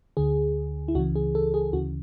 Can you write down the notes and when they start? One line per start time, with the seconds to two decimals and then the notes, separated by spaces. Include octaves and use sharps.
0.17 D2 D3 G#4
0.88 E4
0.95 C#2 C#3 E3 F#4
1.15 G#4
1.35 A4
1.54 G#4
1.73 D2 C#3 E3 F#4